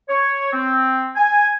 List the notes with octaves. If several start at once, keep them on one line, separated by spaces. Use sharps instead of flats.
C#5
C4
G#5